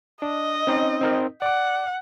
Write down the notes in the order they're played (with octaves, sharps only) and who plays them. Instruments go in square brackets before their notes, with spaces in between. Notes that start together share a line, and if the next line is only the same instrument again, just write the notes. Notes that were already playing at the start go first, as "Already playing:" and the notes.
[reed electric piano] D4 [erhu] D#5
[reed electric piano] C4 C#4 D#4
C4 D#4 A#4
[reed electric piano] D5 D6 [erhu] F#5